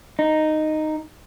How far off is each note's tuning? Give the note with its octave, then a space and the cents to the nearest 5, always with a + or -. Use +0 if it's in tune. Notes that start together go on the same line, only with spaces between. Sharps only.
D#4 -5